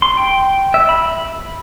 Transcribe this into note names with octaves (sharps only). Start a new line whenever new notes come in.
C6
G5
E5
B5